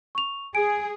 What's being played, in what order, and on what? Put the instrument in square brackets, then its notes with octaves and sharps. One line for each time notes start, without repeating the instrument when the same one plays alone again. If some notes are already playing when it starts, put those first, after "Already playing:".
[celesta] C#6 F7
[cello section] G#4 [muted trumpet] G#5 [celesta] D7